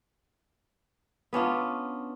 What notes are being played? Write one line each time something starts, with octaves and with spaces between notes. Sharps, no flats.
B3 C#4 D4 F4